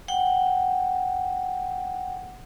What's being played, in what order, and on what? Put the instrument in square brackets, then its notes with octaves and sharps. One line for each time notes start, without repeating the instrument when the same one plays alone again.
[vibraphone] F#5 G5